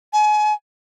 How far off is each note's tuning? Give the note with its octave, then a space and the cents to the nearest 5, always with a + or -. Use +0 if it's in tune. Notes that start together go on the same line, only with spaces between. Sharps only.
G#5 +35